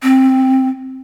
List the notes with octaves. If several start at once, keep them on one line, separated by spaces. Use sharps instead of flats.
C4